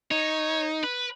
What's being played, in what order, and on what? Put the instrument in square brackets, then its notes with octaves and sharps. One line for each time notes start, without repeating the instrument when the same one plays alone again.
[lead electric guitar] D#4 [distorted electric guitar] C#5
[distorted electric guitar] B4